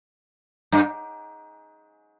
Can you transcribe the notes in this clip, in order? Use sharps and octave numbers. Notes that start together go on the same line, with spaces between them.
G2